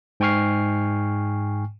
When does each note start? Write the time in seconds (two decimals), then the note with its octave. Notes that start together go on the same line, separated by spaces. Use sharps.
0.20 G#2 G5 G#5 C#6 F6 C7